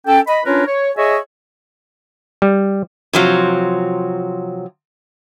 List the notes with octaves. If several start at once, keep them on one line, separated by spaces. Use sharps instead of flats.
C#4 A4 G5
D#5 B5
C#4 D4 F4 A#4 B4 C#5
C#5
G#4 C#5 D#5 E5 G#5 C#6
G3
C3 F3 F#3